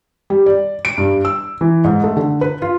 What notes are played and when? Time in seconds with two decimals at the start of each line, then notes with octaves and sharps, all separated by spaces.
0.30 G3
0.46 D5
0.85 D7
0.98 G2
1.25 E6
1.61 E3
1.84 G#2
2.04 A3
2.17 D3
2.41 B4
2.62 F4